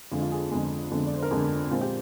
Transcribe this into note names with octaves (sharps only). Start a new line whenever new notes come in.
F2 D3 G#3 F4
F4
G#4
F2 D3 G#3
F2 D3 G#3
D5
C5
A#4
F2 D3 G#3 G#4
A#2 G#3 C4 F4
G4